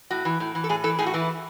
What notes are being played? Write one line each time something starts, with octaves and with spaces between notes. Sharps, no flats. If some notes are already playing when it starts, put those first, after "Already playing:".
A2 F#4
E3
A2
E3
A4
A2 G#4
E3 A4
A2 G#4
F#4
E3 E4